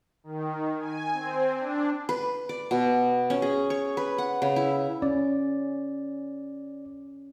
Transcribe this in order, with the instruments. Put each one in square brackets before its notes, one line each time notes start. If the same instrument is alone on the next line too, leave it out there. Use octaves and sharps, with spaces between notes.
[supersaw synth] D#3
G#5
C4
D4
[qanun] B4
D5
B2
C#4
G#4
C#5
B4
F#5
C#3
E4
[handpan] C#4 [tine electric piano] D5